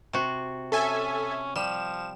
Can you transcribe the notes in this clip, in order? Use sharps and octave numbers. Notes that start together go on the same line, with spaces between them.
C3 F#4
C#4 A4 E5 G#5
F3 G3 E7